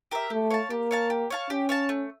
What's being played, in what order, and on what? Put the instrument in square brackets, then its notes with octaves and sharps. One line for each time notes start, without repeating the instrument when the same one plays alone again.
[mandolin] G4 A#4 E5
[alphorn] A3 [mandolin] G4
[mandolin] C#5 F5 A5
[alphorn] A#3 [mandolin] G4
[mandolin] C#5 F5 A5
G4
C#5 F5 A5
[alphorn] C#4 [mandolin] G4
[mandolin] C#5 F5 A5
A3